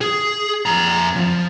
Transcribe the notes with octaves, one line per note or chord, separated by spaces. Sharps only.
G#4
F2 A#5
F3